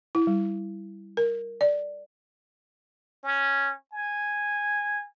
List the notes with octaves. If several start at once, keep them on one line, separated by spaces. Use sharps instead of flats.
E4
G3
A#4
D5
C#4
G#5